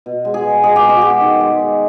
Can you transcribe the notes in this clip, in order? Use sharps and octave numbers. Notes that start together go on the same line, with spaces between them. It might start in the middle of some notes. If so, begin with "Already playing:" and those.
B2
G#3
G#4
B2
G#3 G#4
G4
B2
F#4
G#3 G4
D#3
G#3
D#3